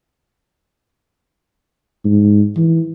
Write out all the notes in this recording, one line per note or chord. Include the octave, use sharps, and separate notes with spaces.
G#2
E3